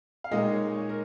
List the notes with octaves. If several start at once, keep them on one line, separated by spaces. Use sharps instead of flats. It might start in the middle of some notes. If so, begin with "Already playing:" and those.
F5
A#2 G#3 D#4 D#5
C#5
C#5
A#4